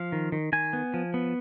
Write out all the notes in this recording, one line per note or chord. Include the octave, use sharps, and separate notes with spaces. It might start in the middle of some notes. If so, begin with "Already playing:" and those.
Already playing: F3 F5
D#3
D#3
D#3 G#5
B3
F3
B3